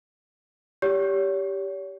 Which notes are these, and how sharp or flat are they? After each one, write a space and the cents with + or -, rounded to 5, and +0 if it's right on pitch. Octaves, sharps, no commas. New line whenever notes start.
G4 +0 C#5 +40